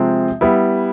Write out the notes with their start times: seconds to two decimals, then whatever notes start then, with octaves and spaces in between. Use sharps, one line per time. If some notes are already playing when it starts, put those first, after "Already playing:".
Already playing: C3 F3 G#3 C4
0.41 G3 B3 E4